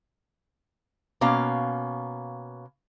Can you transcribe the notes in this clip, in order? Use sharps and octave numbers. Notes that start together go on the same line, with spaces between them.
B2 A#3 C#4 F5